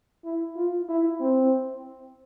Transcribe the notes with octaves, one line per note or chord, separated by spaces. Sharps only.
E4
F4
E4
C4